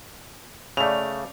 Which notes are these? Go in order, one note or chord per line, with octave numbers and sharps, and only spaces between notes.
C#3 A3 D5 G6 F7